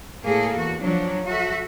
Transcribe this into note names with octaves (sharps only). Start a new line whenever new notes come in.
A2 A#3 G#4 A4
E2 F#4
F3 F#3 D4
F#4 A4 E5